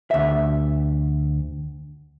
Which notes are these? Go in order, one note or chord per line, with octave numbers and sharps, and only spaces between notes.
D2 E5